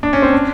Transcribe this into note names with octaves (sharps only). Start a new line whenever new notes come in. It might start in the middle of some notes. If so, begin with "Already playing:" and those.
D4
C#4
C4
D4